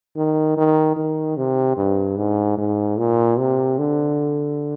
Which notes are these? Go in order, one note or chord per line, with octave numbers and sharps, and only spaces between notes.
D#3
D#3
D#3
C3
G2
G#2
G#2
A#2
C3
D3